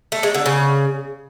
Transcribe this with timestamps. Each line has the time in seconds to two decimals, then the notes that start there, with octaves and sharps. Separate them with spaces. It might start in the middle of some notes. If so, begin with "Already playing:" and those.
0.12 A3
0.23 G#3
0.34 D3
0.46 C#3